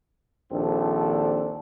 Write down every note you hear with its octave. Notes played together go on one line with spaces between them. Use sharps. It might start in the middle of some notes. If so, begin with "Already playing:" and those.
A#1 D#2 C4 D4 A4